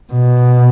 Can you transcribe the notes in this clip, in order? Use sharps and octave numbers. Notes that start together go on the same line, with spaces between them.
B2